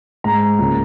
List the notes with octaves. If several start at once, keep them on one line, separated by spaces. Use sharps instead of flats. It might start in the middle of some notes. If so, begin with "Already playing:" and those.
G#2 G#3 A#5
C#2 C#3 A#3